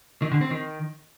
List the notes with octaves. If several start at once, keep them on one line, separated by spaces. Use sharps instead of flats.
D#3
D3
C4
D#3